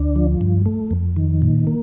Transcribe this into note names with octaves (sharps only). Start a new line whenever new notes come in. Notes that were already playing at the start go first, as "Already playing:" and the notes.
Already playing: D2 D4
F3
G2
A3
F2
D#3
A#2
A#3